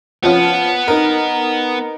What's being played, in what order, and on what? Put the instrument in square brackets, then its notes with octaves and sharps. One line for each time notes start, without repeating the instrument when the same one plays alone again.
[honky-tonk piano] F3 C#4 F4 [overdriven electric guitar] B3
[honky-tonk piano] D#4 A#4